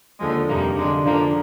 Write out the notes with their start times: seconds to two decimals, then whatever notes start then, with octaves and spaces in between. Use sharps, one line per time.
0.20 D#2 D3 F3 G#3
0.48 F2 C3 G3 A#3 D#4
0.76 D3 G#3 D4
1.05 D3 F3 A#3 D4